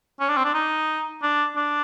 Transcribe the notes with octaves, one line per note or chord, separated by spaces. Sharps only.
C#4
D4
C4
D4
D#4
D4
D4